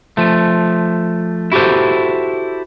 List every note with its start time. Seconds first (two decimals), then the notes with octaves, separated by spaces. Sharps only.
0.17 F3 A3
1.52 E4 F#4 G4 A4 C5